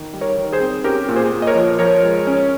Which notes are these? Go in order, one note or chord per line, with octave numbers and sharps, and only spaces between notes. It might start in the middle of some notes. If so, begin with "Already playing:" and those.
Already playing: D#3
G3
A#4 C#5
D#3
G#4 C5
C4
C#4 G4 A#4
A#2
G#4 C5
A#2
D#5
A#4 C#5
F3
F3 A#4 C#5
G#3
C#4